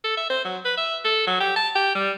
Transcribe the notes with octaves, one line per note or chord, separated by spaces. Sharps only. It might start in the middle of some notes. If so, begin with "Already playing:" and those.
A4
E5
C5
F#3
B4
E5
A4
F#3
G4
A5
G4
G3